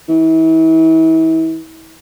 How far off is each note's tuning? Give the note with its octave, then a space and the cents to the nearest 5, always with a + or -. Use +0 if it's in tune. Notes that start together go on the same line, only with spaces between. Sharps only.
E3 -35